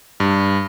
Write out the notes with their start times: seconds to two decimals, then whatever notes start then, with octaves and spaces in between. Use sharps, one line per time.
0.20 G2